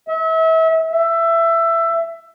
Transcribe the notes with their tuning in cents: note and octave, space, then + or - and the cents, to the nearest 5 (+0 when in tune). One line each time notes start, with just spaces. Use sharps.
E5 -35
E5 +15